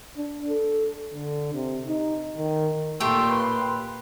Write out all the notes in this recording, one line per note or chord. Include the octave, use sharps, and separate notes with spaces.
D4
A4
D3
C3
D#4
D#3
A#2 A3 G4 G5 C6
B4